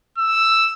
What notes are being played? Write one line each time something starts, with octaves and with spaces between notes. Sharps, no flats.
E6